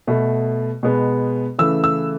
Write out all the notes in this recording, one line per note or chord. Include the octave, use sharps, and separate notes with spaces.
B2 A3
B2 G#3 B3
C#3 E3 A3 E6
E6